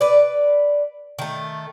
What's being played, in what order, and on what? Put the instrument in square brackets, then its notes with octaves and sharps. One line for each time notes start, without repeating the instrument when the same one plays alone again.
[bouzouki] B4 D5
D#3 A3